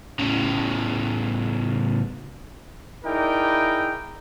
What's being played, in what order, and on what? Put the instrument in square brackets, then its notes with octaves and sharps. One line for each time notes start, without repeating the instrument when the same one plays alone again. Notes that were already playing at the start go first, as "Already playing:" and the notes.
[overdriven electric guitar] A2 C#3
[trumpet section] D#4 E4 G#4 A#4 D5 G5